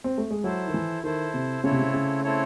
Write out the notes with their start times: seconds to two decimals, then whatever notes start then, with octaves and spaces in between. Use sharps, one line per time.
0.04 C4
0.18 A3
0.31 G#3
0.44 F#3 E4 A4 C5
0.67 D#3
0.74 E3
1.03 D#3 E4 A4 C5
1.34 C3
1.64 C#3 A3 C4 E4 A4 C#5
1.72 C3
1.79 C#3
1.94 C#3
2.24 A3 C4 E4 A4 C#5